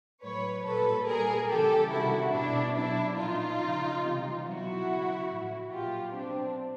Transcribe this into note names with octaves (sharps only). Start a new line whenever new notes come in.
A2 F#3 B4 C#5
A#2 G3 A4 B4
A#2 G3 G#4 A#4
C#3 E3 G3 G4 A4
C3 D#3 G3 E4 F#4
B2 G3 D4 E4
B2 F#3 D4 E4
A#2 F3 D#4 F4
C#3 F3
C3 E3 G3
B2 F#3 E4 F#4
C#3 F#3
A2 F3
A#2 F#3 F4 G4
B2 F#3 C4 D4